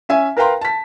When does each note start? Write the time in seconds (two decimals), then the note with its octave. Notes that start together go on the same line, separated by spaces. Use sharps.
0.09 C#4 E5 G#5
0.37 A#4 B4 F5 G5 A#5 C6
0.61 A5 B6